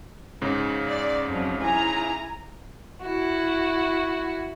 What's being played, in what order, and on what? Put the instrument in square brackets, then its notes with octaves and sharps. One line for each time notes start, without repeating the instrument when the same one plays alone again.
[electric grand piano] G#2 C#3
[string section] D5
F2 F3 F#3
E4 G#5 A#5
[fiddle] E4 F#4